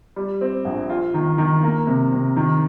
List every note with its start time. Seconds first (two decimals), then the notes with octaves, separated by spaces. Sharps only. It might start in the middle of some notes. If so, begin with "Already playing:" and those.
0.16 G3
0.41 C4
0.65 A#1
0.89 F4
1.14 D#3
1.38 D#3
1.63 A#3
1.87 C3
2.12 C3
2.36 D#3